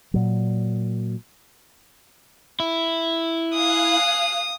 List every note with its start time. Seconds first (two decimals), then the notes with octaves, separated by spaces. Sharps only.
0.14 A#2 F#3
2.60 E4
3.53 F5 G#5 D#6 F#6